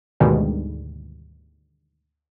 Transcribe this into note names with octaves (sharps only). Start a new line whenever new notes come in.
D2 G#2 B2 D#3 G3 G#3